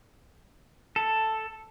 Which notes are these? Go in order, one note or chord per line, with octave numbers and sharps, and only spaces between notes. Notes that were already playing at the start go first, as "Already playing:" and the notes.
A4